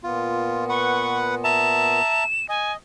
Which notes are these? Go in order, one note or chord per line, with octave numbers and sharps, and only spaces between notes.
A#2 B3 F4
B4 F#5 C#6
E5 A5 A#5 E7
D#5 G#5